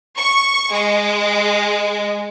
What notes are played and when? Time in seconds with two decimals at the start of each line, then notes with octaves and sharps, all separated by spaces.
0.17 C#6
0.70 G#3